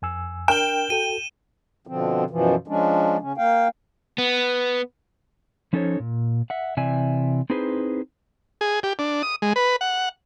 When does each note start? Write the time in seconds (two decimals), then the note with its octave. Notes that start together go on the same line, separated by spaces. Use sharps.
0.02 F2 G#5 E6
0.48 D4 A#4 G5 F6 E7 G7
0.90 F#4 A4 D#7
1.87 B2 D3 F3 C4
2.30 F#2 B2 E3 F3
2.68 F3 G#3 C#4 D4
3.21 C#3 C#4
3.38 A#3 F5 G5
4.18 B3
5.73 F3 C#4 D#4 A4 C5 C#5
6.00 A#2
6.50 E5 F#5
6.77 C3 E3 D5 E5 G#5
7.50 C4 D#4 E4 G#4 B4 C5
8.61 G#4
8.83 G4
8.99 D4
9.23 D#6
9.42 G#3
9.56 B4
9.81 F#5